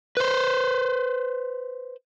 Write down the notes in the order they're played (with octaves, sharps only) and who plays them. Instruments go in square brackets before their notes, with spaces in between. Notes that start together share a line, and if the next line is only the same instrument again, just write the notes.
[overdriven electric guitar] B4 C5